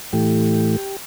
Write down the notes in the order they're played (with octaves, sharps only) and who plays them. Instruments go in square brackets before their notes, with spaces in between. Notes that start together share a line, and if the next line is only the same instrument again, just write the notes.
[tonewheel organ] A2 E3 A3 G4